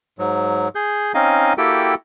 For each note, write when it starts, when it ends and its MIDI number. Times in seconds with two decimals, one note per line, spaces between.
0.19 0.68 44
0.19 0.68 54
0.75 1.12 68
0.75 1.12 91
1.14 1.53 60
1.14 1.53 61
1.14 1.53 63
1.14 1.53 75
1.14 1.53 77
1.14 1.53 80
1.58 1.95 58
1.58 1.95 64
1.58 1.95 66
1.58 1.95 67
1.58 1.95 69
1.58 1.95 79